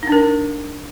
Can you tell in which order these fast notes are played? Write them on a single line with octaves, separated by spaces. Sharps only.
D#4 D4 A#4